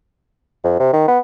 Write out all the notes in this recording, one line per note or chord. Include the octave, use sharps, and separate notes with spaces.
F2
C3
D#3
B3